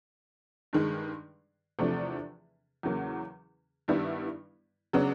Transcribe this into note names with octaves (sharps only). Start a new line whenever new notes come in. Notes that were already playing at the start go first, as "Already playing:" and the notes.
G2 D#3 G#3
E2 C3 F3 A3 D4
E2 C#3 F#3 A#3
G2 D#3 G3 B3 E4
C#3 F#3 B3 D4